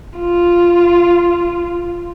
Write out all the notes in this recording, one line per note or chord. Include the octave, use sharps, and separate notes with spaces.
F4